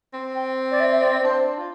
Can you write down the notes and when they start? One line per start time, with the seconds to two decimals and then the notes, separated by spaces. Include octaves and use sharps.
0.14 C4
0.35 G5
0.71 D5
0.80 E5
0.91 E5
1.02 D5
1.24 D4 C5
1.58 F4